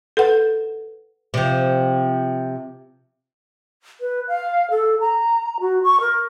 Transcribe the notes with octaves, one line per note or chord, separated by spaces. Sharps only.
A4 B4 F#5
C3 F3
B4
F5
A4
A#5
F#4
C#6
A#4